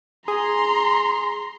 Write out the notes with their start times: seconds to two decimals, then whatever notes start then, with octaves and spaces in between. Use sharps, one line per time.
0.28 G#4 A#5 C6